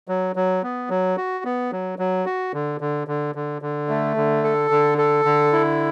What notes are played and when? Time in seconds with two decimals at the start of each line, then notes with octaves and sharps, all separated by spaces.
0.08 F#3
0.36 F#3
0.63 B3
0.90 F#3
1.17 F#4
1.45 B3
1.72 F#3
1.99 F#3
2.26 F#4
2.54 D3
2.81 D3
3.07 D3
3.35 D3
3.62 D3
3.89 A3
4.17 D3
4.44 A4
4.71 D3
4.98 A4
5.25 D3
5.53 E4